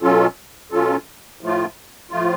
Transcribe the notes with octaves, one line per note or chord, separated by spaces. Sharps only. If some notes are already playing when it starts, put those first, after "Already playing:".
B2 F#3 C#4 F4 A4
B2 F#3 C#4 F4 A4
A2 F3 A3 F4
A2 F3 A3 F4